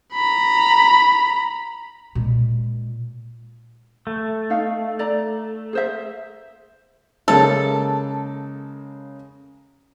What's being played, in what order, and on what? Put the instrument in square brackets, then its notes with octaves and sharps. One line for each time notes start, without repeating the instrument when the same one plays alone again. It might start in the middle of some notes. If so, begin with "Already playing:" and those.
[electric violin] A#5 B5
[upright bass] A#2 G#3
[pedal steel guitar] A3
[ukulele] D#4 F5
D5 A#5
G#4 C5 E5
[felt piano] C#3 G#3 A#3 [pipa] A4